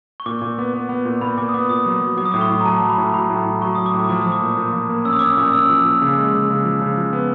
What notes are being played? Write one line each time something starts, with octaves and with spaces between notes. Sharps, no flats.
C#6
A#2 D6
A#2
B3
B3
B3
A#2
A#2 B5
A#2 D6
D#6
B3 D6
A#2 D#6
F#3
F#3
F#3 D6
D#6
A2 D6
C#6
A2
A#5
F#3 A5
F#3
B5
A2
F#3 B5
A2
A2
F#3 C#6
F#3 D#6
D6
A2
F3 D6
F3 D#6
D6
A#2
A#2
F3
A#3
C#4 E6
D#6
C#4 D6
D#6
A#2
C#4 E6
F3
A#2
C#3
G#3
C#3
C#3
F3
C#3
F3
B3